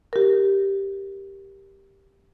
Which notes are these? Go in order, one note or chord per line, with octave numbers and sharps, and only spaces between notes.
G4 A#4